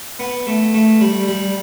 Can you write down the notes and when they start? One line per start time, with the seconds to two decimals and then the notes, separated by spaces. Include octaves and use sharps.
0.19 B3
0.47 A3
0.74 A3
1.01 G3
1.28 G3